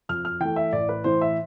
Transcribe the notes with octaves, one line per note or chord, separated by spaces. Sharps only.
F2 F6
F6
E3 A3 G5
E5
A1 D5
B4
A2 E3 C5
E5